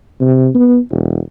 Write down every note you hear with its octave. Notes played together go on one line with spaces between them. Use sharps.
C3
B3
E1